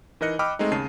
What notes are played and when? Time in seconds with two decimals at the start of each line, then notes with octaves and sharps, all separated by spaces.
0.21 E3 D#4 A#4 D#5 F#6 C#7
0.39 D#5 G5 B5 D6 E6 F6
0.59 G#3 A3 C4 D#4
0.71 D#2 C#3 A5 C7 D#7